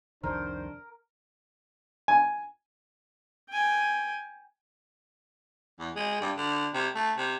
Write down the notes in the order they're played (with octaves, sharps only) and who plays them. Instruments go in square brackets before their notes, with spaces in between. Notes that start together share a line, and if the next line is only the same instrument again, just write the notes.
[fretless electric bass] C2 F2 D#3 [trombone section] D4 C5 [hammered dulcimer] A#4
[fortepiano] G#5
[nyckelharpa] G5 G#5
[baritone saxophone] E2
G#3
G2
D3
C3
A3
C3